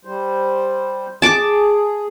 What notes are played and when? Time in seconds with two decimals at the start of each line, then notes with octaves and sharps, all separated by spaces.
0.05 G3 C5
1.22 G#4 A5 D6